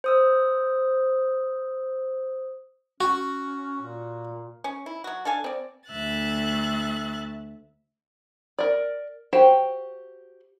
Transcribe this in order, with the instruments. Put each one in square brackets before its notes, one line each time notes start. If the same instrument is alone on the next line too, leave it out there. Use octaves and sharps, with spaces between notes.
[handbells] C5 D#6 E6
[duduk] C#4 [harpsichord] F#4 [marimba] C#6
[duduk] A#2
[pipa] C#4
E4
F#3 F#4
D4 A4 F5 G#5
C4 D5
[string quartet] D2 E5 F#6 A6
[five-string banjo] A#4 D5
F#4 G4 C5 G5